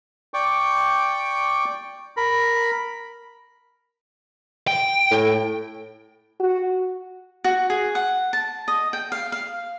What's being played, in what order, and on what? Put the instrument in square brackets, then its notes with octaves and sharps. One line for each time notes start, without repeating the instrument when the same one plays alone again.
[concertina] D5 G5 C#6 D6
A#4 B5
[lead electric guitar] G5
[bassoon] A2
[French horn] F#4
[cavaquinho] F#4
G#4
F#5
A5
D#5
G5
F5
F5